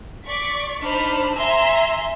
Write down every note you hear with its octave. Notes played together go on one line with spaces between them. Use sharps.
D5 C#6 B6
D4 D#4 C5 B5 F6
E5 G#5 A#5 C6 E6